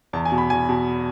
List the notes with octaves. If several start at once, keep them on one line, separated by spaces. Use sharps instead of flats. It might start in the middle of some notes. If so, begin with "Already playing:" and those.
E2 A5
G#5
B2
B5
E2 G#5
B2